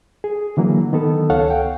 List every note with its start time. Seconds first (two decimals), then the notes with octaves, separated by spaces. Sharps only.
0.24 G#4
0.57 D3 E3 F#3 A#3
0.93 D#3 B3 A4
1.30 C#2 A4 C#5 F5 F#5
1.50 G5